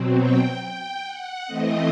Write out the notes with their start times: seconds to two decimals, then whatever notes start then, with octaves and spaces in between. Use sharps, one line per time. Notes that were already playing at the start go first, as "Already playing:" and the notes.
Already playing: B2 F#3 C4
0.19 G5
0.62 G5
1.04 F#5
1.46 E3 A3 C4 D#5